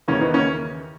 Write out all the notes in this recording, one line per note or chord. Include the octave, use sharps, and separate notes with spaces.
D#2 C#3 E3 A#3 C#4
B3 D#4
A#3 C#4